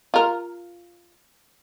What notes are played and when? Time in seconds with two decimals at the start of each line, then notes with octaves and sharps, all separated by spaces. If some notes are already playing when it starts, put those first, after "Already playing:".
0.14 F4 A#4